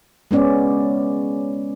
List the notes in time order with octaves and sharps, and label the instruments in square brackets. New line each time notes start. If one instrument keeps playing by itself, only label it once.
[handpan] G#3 B3 C#4 D5